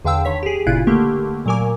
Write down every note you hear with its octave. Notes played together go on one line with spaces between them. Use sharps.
E2 D3 F5 G5 E6
D3 D#3 C#5 B6
G4 G#4
G1 A#2 C#3 E4 F4 F#6
D3 A3 A#3 G4
A#2 F#3 A#4 G#5 D6